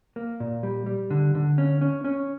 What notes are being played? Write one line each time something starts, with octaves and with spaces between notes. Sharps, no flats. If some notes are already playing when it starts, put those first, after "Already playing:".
A#3
A#2
G3
G3
D3
D3
C#4
C#4
C#4